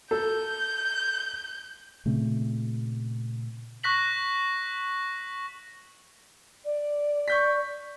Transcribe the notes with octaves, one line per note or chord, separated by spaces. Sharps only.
A4 G6
A#2 C#3 A3 C4
C#6 F#6 A#6 B6 F#7
D5
C#6 G6 B6